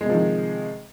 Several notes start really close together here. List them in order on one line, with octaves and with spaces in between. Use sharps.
G#3 C3 F3 D#3